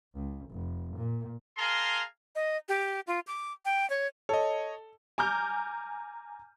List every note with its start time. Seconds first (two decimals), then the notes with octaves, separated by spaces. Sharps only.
0.14 C#2
0.50 F1
0.97 A#2
1.57 G#4 A#4 F5 A5 A#5 C6
2.35 D#5
2.69 G4
3.07 F4
3.27 D6
3.65 G5
3.90 C#5
4.29 A4 C#5 D#5
5.18 G#5 A#5 D6 F6 G6